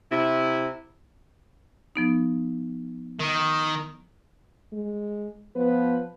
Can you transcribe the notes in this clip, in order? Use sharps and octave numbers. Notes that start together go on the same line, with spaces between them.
C3 E4
F3 B3 D#4
D#3
G#3
F3 B3 B4